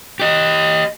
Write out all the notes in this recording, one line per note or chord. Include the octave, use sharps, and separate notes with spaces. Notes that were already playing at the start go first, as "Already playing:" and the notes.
G4 D#5